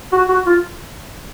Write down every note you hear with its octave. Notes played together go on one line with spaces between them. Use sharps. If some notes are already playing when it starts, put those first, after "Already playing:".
F#4
F#4
F4